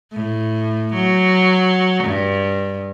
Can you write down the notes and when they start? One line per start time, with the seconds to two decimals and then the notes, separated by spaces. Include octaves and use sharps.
0.13 A2
0.94 F#3
2.04 G2